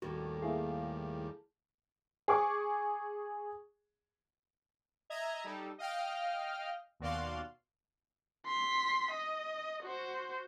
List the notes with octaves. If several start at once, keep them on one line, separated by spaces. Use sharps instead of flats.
D#2 A2 G3 F#4
A#3 E4 G#4 F5
G#4 C#6 D6
D#5 E5 A#5 G#6
G3 D#4 A4
D#5 F5 G5 F6
D#2 B2 F#4 D5 F5 C6
C6 B6
D#5
F#4 C5